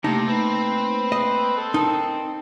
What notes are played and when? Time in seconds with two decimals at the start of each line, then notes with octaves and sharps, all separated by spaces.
0.04 C3 A3 A#3 D#4 G4 A5
0.28 C4 B4
1.12 D#5
1.57 A4
1.74 D#4 A#4 A5